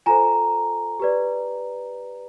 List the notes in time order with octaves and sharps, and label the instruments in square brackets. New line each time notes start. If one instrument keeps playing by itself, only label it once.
[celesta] F4 A4 C5 G#5 A#5
G4 B4 D5